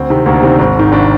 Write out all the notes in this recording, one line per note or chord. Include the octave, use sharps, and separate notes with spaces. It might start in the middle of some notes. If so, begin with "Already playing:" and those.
Already playing: D2 C4
C3 D#3
D2 A#3
D4
C3 D#3 C4
G#1 C4
G#2 D#3
G#1 D4